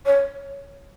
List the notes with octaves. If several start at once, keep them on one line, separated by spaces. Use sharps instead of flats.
C#5